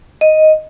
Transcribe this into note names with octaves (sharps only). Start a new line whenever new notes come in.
D#5